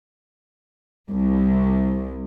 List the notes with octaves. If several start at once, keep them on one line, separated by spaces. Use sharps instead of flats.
C2